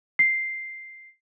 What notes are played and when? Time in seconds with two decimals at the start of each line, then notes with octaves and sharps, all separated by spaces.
0.19 C7